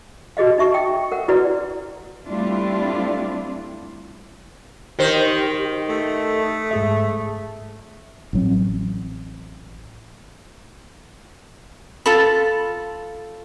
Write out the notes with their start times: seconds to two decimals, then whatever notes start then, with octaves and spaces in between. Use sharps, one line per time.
0.37 F#4 G#4 D#5 F5
0.58 D#4 E5 C#6
0.74 G5
1.12 A#4 F#5
1.28 E4 F#4 B4 D5
2.27 G3 A3 C4 D4 E4 F4
4.99 D#3 G4 C5
5.89 A3
6.71 G#2 G#4 E5
8.33 A1 F#3 C4
12.06 F4 A4 B5